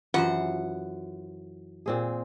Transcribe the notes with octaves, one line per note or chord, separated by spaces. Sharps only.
F#2 E3 F4 G4 C5 F#5 B5
A#2 C4 G#4